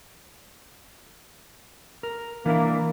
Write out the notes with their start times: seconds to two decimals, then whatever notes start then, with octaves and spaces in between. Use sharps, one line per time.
2.03 A#4
2.46 E3 A#3 D4 E4